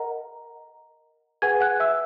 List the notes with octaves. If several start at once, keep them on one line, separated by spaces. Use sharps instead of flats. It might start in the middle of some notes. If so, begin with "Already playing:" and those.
Already playing: A#4 D#5 F#5 A#5
G#4 B4 F#5 G#5 G#6
F#5 F#6
E5 E6